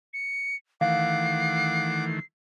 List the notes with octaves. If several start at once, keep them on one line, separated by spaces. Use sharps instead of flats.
C#7
D#3 E3 A3 F5 F#5 D6 C7